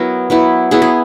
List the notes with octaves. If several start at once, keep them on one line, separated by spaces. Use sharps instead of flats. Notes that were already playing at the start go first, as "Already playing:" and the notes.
Already playing: F#3 B3 E4 A#4
F#3 B3 E4
F#3 B3 E4 G#4
G#4